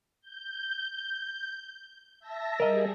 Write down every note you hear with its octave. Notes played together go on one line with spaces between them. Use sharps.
G6
E5 A5 A#6
G3 G#4 A#4 D#5